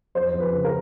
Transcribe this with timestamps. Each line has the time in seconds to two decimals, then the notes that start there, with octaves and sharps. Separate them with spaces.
0.15 F2 C5
0.33 F2
0.40 B4
0.52 C#3
0.65 A#4